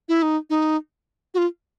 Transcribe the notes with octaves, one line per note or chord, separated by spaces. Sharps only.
E4
D#4
D#4
F#4
F4